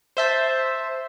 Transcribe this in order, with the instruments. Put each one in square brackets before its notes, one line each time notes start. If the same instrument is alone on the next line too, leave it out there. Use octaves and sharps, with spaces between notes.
[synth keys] C5 E5 A5